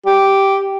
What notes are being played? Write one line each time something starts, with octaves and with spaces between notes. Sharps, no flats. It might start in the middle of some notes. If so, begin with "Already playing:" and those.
G4